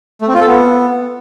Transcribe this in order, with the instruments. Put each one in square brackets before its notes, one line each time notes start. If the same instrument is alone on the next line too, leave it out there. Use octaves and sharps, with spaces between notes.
[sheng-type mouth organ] A3
C4
F4
A4
B3